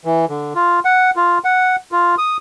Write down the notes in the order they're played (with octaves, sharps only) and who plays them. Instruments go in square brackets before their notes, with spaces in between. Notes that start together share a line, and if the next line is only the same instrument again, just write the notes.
[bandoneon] E3
D3
F4
F#5
F4
F#5
F4
D#6